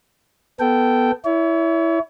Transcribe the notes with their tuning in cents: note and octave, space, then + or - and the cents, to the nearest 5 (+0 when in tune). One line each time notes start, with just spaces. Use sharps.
B3 +0 A4 +0 G5 -10
E4 +0 C#5 +35